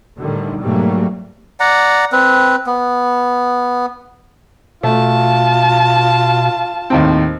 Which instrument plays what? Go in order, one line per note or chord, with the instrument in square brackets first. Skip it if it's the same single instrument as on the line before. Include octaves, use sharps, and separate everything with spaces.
[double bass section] A2 D3 D#3 G3
G#2 B2 F#3 G3 A3 A#3
[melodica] D5 F#5 A#5
C4 B4
B3
[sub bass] B2 [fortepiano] A3 [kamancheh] F4 A5
[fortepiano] D#2 A2 C4